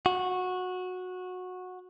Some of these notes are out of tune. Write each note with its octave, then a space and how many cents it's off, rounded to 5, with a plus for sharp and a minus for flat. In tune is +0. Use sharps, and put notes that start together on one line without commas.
F#4 -15